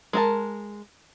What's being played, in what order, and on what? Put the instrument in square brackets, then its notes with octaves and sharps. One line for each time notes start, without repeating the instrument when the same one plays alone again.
[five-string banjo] G#3 A#4 A5